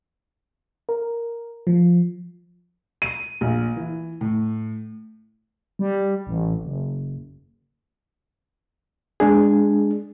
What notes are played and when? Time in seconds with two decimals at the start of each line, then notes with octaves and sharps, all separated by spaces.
0.89 A#4
1.67 F3
3.02 D#7
3.41 A#1
3.76 E3
4.21 A2
5.79 G3
6.27 A1
6.63 F#1
9.20 G#3 D4 G#4